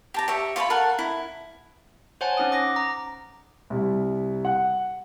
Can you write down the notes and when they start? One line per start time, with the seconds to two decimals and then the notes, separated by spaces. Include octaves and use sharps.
0.14 G4 A5 A#5
0.28 G4 C#5 E5
0.56 F4 C#5 A5 B5
0.70 A4 A#4 F5 F#5
0.99 E4
2.21 C5 C#5 F#5 G#5 A5
2.37 C#4 D#4 F#5 D#6
2.52 D6 A#6
2.76 A#5
3.70 C2
4.45 F#5